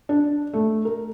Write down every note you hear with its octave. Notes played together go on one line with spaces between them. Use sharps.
D4
A3
A#4